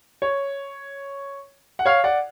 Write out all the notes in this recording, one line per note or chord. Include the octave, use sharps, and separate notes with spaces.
C#5
F#5
C#5 F5
D5 F#5